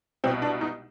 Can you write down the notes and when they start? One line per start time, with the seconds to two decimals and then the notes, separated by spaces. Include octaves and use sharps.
0.24 C2 B2 C4
0.42 D4
0.61 D#4